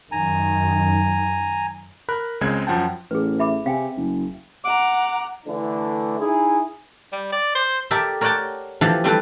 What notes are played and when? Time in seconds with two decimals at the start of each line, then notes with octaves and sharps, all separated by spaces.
0.12 F#2 D#3 G#5 A#5
2.09 A#4 B5 F#6
2.41 C#2 C#3 G#3 C4 G5 G#6
2.67 F#2 F3 F#5 G5 A5
3.11 A1 G#4 B4
3.39 E5 B5 D6
3.66 C3 F5 G5 G#5
3.97 F#1
4.64 F#5 A#5 D6
5.46 D3 E3 A3 D4
6.19 D#4 E4 G#4
7.13 G3
7.33 D5
7.55 C5
7.91 G4 A4 A#4 D5 E5
8.21 A#4 C#5 D5 F#5 G5 A5
8.81 E3 F3 G4 A4
9.04 G3 C4 A4 B4